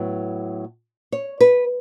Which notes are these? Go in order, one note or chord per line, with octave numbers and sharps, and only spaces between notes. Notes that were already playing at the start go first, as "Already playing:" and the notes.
Already playing: A2 F#3 B3
C#5
B4